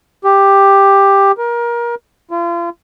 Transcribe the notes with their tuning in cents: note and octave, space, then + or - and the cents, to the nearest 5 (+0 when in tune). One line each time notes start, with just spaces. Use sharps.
G4 +10
A#4 +25
F4 -35